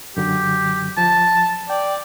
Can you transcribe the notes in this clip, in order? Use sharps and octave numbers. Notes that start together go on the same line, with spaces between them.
F#2 D3 F#3 G4
F3 A5
D5 G5